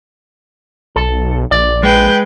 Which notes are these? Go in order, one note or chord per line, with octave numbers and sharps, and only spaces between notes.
B1 A4
A#1 D5
G#3 B4 G5